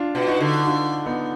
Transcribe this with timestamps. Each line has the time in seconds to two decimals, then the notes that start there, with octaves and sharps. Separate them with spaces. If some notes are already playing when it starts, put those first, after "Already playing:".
Already playing: D4 F4
0.15 B2
0.27 D#4 F#4
0.40 D3
0.67 D4 F4
1.06 B3 D#4